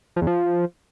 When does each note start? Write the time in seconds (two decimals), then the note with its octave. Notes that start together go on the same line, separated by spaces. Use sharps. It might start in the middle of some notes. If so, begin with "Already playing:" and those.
0.16 F3
0.22 E2
0.27 F3